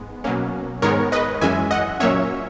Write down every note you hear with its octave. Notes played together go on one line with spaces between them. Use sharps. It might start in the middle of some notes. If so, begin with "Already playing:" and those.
Already playing: G#2 G#3 B3
B2 F#3 A#3 C#4
G#2 D#3 G#3 B3 A#4 C#5
B4 D#5
F#2 E3 G#3 C#4 E5 G#5
D#5 F#5
A#2 F#3 A#3 C#4 C#5 E5